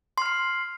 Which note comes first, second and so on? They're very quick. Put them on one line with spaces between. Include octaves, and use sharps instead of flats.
C6 F6 C7